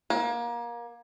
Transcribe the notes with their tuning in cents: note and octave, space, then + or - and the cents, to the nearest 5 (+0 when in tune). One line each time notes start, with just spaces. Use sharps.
A#3 +25